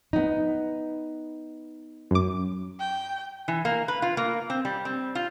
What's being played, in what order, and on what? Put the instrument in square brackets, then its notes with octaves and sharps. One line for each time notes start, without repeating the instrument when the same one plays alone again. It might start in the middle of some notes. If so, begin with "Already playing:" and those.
[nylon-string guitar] B3 D#4
[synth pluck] F#2 D6
[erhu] G5
[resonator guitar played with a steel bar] E3
A#3
B4
F4
A#3
C4
G3
C4
F4